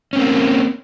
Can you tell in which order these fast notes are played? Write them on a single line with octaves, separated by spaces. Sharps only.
C#4 C4 A#3